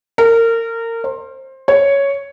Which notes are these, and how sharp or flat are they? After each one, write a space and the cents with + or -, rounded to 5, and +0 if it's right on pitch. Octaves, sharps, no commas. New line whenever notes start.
A#4 -25
C5 +20
C#5 +5